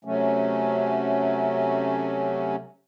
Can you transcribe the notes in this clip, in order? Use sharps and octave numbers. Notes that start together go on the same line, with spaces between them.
C3 F#3 A3 C#4